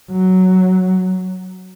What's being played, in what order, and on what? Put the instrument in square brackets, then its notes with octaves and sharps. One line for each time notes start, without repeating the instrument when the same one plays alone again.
[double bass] F#3